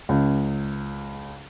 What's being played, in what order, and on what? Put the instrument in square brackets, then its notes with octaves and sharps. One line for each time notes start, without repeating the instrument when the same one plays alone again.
[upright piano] C#2